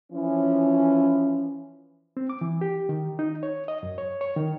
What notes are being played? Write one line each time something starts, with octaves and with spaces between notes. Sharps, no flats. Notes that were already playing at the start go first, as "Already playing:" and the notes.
E3 F3 C#4
C4
D6
E3
G4
D#3
D#4
C#5
D#5
F#2
C#5
C#5
D#3